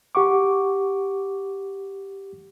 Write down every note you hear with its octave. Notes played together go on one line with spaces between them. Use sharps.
G4 F#5 C#6 D6